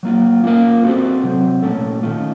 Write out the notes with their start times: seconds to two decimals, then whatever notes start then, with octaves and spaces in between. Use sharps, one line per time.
0.03 F#3 A#3 F4
0.44 A#3 C#4 F4 A#4 F5
0.84 C4 F#4 A4 C5
1.23 C3 F#3 C4
1.62 A#2 A3 C#4 A4
2.03 D#3 A3 C#4 F4